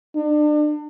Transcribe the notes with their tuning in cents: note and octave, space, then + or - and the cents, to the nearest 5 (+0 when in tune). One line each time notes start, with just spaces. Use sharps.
D4 +35